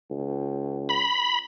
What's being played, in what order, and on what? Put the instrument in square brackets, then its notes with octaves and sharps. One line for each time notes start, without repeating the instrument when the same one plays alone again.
[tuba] C#2
[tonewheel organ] B5